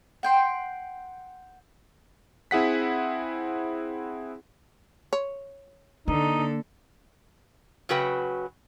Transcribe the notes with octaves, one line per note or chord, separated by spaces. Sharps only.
F#5 G5 C6
C4 E4 G#4 F#5 B6
C#5
D3 A#3 D#4 A4
C#3 F#3 F#4 B4 G5